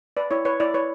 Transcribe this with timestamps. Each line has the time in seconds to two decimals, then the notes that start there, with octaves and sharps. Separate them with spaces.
0.17 B4 D5
0.31 E4 C#5
0.45 B4 C#5
0.60 E4 D5
0.74 B4 C#5